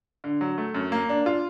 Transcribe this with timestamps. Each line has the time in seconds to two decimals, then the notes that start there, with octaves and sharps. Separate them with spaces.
0.24 D3
0.41 F#3
0.58 A3
0.75 F#2
0.92 A#3
1.09 D4
1.26 F4